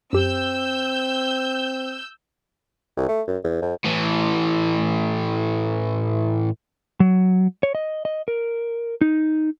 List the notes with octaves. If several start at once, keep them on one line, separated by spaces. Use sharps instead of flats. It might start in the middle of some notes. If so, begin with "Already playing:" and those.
F#2 C4 G4 E6 G6
C2
A3
F#2
E2
F2
A2 E3
F#3
C#5
D#5
D#5
A#4
D#4